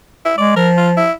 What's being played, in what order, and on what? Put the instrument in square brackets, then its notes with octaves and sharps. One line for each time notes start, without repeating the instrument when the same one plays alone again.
[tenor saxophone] E4
[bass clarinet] G#3 [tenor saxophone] D5
[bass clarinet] F3 [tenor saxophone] A#4
[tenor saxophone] F4
E4